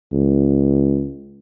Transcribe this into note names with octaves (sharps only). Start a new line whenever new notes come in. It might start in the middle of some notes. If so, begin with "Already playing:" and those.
C#2